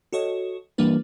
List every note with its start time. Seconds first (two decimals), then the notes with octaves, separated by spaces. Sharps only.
0.13 F#4 A4 C#5 D#5
0.78 E3 G3 A#3 D4 B4